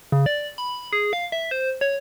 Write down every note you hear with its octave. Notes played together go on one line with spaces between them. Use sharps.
C#3
D5
B5
G#4
F5
E5
C5
C#5